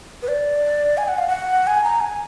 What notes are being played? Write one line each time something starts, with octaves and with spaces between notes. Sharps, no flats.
B4
D5
G#5
F#5
F5
F#5
G#5
A#5
G#5